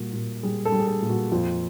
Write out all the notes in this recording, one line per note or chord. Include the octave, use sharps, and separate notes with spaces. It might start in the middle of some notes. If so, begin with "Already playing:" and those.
Already playing: A#2 G3 F#4
A#2
G3 G#4
A4
G3
G#4
A4
A#2
F#4
F2 F4